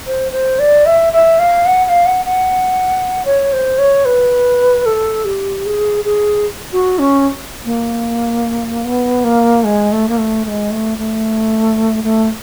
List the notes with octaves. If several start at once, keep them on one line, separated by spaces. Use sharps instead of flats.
C5
C5
D5
E5
E5
F5
F#5
F#5
F5
F#5
F#5
C#5
C5
C#5
B4
A4
G4
G#4
G#4
F#4
C#4
A#3
B3
A#3
G#3
A3
A#3
A3
A3
G#3
A3
A3
A3